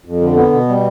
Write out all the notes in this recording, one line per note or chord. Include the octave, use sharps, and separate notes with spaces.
F2
D3
B3
B2
G3